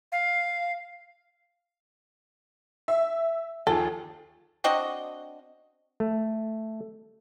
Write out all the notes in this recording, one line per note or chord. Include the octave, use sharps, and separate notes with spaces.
F5
E5
D#2 F3 G#4 A4
C4 D4 F#4 D#5
A3